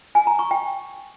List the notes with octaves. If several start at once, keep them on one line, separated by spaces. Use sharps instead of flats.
G#5
A#5
C#6
G5